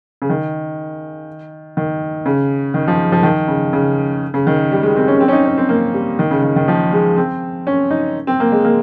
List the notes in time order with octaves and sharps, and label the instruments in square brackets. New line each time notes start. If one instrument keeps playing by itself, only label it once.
[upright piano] C#3
D#3
D#3
C#3
D#3
F3
F3
D#3
C#3
C#3
C#3
D#3
G3
G#3
C4
C#4
C4
C#4
D#4
C#4
C4
A#3
G3
D#3
C#3
D#3
D#3
F3
G#3
C4
C#4
D#4
C4
A#3
G#3
A#3